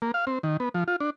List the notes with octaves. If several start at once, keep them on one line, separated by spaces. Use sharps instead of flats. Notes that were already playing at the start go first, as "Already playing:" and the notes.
A#3
F5
C4
D#3
B3
F3
F4
D4